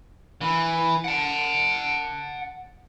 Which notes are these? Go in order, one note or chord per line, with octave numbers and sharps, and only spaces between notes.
E3
F#5 A5